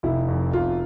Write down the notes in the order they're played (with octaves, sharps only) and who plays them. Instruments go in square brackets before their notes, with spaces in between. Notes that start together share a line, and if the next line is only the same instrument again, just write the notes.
[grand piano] F1 [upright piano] E4
[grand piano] F2
[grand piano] F1 [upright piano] F4